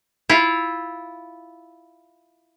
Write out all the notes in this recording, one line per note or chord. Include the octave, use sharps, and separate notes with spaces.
E4 F4